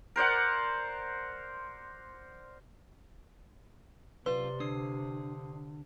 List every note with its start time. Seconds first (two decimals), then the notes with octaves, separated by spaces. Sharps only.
0.16 A#4 C5 D5 F#5
4.26 F#2 C3 F4 B4 D5 C6
4.60 D3 D4 D#6 C7